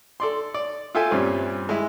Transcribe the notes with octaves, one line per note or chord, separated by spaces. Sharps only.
A4 D5 C6
D5
F4 A4 E5 G5 G#5
G2 A#2 G3 C4 C#4
G#3 E4